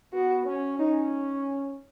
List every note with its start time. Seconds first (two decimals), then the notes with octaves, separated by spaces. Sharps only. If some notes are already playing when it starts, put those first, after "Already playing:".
0.13 B3 F#4
0.45 C#4
0.78 C#4 D#4